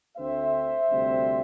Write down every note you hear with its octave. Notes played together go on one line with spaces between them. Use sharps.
D2 D3 A3 C4 C5 E5
D2 C3 G3 C4